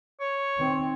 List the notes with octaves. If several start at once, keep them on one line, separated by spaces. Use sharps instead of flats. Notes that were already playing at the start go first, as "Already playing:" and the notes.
C#5
D#3 C4